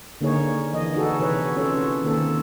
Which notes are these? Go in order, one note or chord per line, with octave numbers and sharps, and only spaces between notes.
D3 A#3 D#4 G#4 C#5
E3 D#5
D#4 F#4 G#4 A4
C3 E3 B4 C#5
C#4 F4 A4 C#5
D#3 A#3 C4 A4